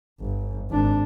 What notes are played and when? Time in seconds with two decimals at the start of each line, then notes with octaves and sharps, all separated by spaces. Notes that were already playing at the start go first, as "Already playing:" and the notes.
0.20 G1
0.70 G#1 D4